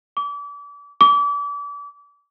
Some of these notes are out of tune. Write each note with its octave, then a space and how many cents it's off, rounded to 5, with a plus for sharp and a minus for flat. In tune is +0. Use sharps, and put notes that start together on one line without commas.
D6 -35
D6 -35